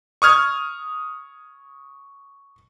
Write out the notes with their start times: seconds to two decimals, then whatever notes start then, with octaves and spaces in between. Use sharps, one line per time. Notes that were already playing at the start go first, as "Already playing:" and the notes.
0.22 C#6 D#6 F6 G#6